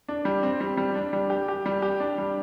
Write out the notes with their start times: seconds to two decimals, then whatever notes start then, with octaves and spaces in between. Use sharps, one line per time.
0.08 D4
0.25 G3
0.43 C4
0.60 G3
0.77 G3
0.95 D4
1.13 G3
1.30 G4
1.48 G4
1.66 G3
1.82 G4
2.00 D4
2.18 G3